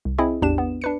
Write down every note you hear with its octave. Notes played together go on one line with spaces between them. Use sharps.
C2
C4 E4 G#4 D#5
A1 E2 D4 G4 E7
B3
D4 B4 C#7